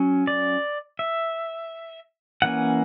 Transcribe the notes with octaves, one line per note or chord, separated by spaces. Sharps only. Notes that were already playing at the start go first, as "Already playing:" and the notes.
Already playing: F#3 C#4
D5
E5
E3 A#3 C#4 F#5